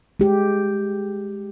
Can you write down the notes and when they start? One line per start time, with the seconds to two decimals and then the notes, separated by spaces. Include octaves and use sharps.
0.20 G#3 G4